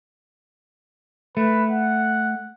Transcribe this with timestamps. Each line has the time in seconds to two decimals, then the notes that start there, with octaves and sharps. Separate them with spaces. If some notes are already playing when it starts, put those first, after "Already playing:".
1.37 A3 B4
1.71 F#5